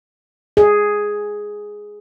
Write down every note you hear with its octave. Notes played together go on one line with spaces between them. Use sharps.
G#4